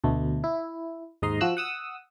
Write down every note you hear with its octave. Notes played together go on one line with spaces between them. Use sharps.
D2 B2 A3
E4
D#2 G#2 D#5 A#5 C6
F3 F#4 E6 F#6
F#5 D#6 E6